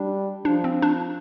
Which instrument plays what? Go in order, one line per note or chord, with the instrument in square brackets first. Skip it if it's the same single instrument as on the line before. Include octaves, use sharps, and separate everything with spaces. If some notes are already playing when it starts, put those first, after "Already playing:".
Already playing: [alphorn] G3 [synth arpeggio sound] D4
[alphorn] F3 [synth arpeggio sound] D4
[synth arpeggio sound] C4
D4